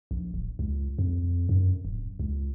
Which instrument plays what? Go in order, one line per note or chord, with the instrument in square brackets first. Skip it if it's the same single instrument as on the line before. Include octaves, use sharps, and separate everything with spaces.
[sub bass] A#1
D1
C#2
F2
F#2
D1
C#2